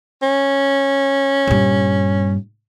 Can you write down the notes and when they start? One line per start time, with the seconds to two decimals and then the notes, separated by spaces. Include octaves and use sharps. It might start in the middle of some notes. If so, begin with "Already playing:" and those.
0.22 C#4
1.47 G2 A#2